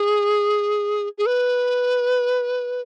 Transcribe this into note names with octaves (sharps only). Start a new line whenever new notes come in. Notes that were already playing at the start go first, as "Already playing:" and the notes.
Already playing: G#4
G#4
B4